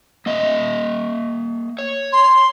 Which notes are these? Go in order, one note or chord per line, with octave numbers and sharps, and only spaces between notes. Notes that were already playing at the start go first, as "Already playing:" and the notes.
A#3 D#5 E5
C#5
C6